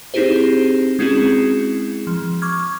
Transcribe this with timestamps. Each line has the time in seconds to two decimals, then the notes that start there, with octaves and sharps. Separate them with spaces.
0.14 C4 D#4 E4 G4 G#4 C5
0.99 G#3 C4 C#4 E4 F#4 G#4
2.07 F3
2.42 C#6 D6 F6 G#6